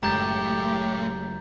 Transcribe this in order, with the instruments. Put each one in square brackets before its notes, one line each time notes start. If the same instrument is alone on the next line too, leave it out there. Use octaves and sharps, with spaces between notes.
[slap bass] F#1 F#2 G#3 [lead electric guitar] A2 [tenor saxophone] G4 [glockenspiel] A#5 G6 A6